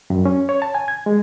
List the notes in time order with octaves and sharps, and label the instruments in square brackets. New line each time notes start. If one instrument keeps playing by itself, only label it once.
[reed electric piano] F#2
C#4
C#5
A5
G#5
G#6
G#3